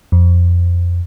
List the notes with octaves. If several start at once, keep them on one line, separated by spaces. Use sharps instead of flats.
F2